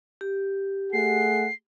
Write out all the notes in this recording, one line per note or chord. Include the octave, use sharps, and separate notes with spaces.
G4
A3 G#4 F#5 C7